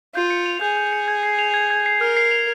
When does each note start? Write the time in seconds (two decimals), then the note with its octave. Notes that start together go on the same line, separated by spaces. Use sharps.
0.15 F4 G6
0.30 C#7
0.46 F7
0.61 G#4 G6
0.77 G6
0.93 C#7
1.08 G#6
1.23 C7
1.39 F7
1.54 G#6
1.70 G#6
1.86 C7
2.00 A#4 F6
2.17 C7
2.31 F7